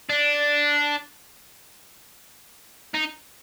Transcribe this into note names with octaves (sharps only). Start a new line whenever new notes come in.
D4
D#4